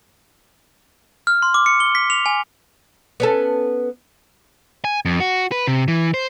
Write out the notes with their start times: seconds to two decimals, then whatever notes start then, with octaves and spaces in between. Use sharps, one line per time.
1.27 F6
1.42 C6
1.54 D6
1.66 C#7
1.80 G7
1.95 B6
2.10 F7
2.26 G#5
3.20 B3 C#4 A4
4.85 G#5
5.05 F2
5.20 F#4
5.52 B4
5.67 C3
5.88 E3
6.14 C5